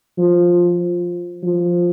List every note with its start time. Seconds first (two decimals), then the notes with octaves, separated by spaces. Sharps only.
0.18 F3
1.43 F3